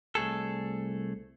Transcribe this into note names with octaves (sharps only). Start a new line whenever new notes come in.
C2 A3 G#4 A4